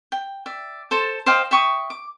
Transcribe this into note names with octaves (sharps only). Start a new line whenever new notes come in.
G5
D5 E5
A4 C5 A5
C5 D#5 F5 G5
E5 G5 C#6 D#6
D6